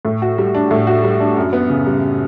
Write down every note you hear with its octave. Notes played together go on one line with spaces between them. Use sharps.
A2
F#4
G3
D4
A2
F#4
G3
D4
F#2
B3
C#3
G3